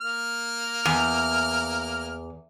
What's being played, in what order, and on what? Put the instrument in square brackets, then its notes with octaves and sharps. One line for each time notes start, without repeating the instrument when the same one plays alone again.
[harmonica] A#3 F6
[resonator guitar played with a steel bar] E2